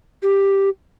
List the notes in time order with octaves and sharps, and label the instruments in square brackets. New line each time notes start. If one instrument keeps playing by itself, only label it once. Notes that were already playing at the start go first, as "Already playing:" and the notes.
[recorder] G4